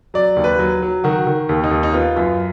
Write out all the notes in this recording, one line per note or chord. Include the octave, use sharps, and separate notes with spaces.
F#3 D5
D#2
B4
F#3
F#3
D#3 F#4
D#3
D#2
D#4
D#2
D#4
B3 F4
F#2 F4